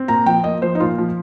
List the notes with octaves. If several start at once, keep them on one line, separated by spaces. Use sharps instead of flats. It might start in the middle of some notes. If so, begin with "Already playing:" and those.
Already playing: C4
A#2 A#5
F3 G5
A#3 D#5
F3 C5
D#4
A#2 F4
F3